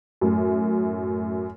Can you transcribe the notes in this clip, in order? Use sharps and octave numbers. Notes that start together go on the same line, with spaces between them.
F#2 A2